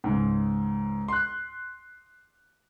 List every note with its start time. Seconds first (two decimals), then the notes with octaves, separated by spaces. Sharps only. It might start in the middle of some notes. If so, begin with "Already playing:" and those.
0.04 C#2 G#2
1.08 C6 F#6